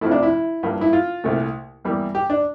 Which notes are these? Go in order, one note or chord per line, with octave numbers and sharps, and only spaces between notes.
F2 C3 F3 A3 E4
D4
E4
G2 F3 A#3
E4
F4
C2 A#2 A3
E2 E3 G3 A#3
G4
D4